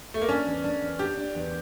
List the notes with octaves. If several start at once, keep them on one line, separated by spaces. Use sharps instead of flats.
A3
A#3
C#4 D4
E2
D4
E2
D4 G4
D4
E2